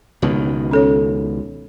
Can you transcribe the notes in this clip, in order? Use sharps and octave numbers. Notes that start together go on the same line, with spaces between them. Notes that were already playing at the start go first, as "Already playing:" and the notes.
C#2 B2 D#3
C#4 A4 C#5